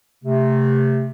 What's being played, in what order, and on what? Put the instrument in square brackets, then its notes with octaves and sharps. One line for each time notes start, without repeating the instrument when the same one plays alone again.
[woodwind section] C3 A3